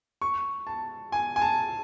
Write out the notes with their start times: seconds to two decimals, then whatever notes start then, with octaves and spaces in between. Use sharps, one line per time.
0.21 C#6
0.67 A5
1.12 G#5
1.36 G#5
1.42 A5